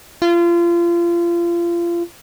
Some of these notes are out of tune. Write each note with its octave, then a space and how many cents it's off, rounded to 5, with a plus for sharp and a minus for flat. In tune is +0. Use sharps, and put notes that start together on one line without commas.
F4 -30